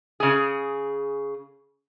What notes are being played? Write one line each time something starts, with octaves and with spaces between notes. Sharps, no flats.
C#3 G#4